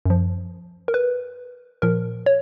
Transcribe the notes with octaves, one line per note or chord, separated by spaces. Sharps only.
F#2 F3
A#4
B4
A#2 F3 A#4
C#5